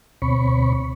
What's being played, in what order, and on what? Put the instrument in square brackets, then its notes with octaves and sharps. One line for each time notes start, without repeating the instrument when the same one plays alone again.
[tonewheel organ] D2 B2 C4 C#5 B5 C#6